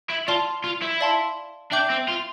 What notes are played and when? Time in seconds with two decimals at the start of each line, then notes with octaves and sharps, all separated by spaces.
0.10 E4
0.28 F4 D5 A5 C6 F6
0.64 F4
0.82 E4
1.01 D5 F5 A5 C6
1.72 D4 E5 G5 D6 G6
1.90 C4
2.08 F4